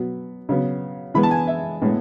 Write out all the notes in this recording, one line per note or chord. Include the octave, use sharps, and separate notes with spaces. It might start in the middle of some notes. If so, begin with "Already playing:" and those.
Already playing: B2 F#3 B3
C#3 F#3 B3
E3 G#3 B3 B5
A5
G#5
E5
A2 G#3 B3